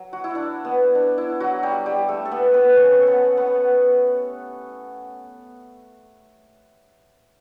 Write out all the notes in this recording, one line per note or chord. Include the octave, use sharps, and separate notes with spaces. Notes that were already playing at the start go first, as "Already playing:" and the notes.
Already playing: F#3
F#4
E4
D4
B3
D4
E4
F#3 F#4
G3 G4
G3 G4
A3 A4
A4
B3 B4
B3 B4
C#4 C#5
B3 A4 B4
B3 B4